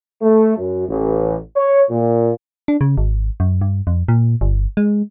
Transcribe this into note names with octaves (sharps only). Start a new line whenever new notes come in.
A3
F#2
A1
C#5
A#2
D4
C#3
G#1
F#2
G2
F2
A#2
G1
G#3